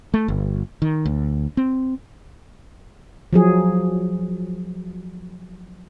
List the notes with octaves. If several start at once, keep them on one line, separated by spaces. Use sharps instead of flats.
A3
G1
D#3
D2
C4
F3 F#3 G#4